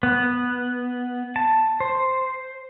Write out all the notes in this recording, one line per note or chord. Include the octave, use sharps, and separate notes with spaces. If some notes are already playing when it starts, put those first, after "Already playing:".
B3
A5
C5